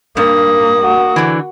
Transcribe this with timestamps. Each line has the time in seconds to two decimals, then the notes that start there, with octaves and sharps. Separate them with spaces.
0.17 G2 A#3 D#6
0.81 F#4
1.16 D3 E3